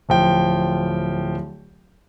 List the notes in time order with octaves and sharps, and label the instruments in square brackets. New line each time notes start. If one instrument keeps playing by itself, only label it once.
[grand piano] D1 F3 G5